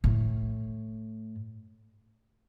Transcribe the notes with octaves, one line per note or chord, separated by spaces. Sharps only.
A2